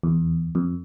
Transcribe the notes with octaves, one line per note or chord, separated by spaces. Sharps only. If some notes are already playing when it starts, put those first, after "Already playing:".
E2
F2